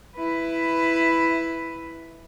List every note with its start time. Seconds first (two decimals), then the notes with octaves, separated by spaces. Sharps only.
0.16 E4 B4